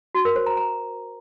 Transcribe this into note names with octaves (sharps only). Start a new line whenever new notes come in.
F#4
A#4
C5
A#5
A#5